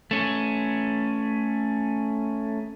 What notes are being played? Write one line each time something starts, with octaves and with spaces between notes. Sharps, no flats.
A3 C#4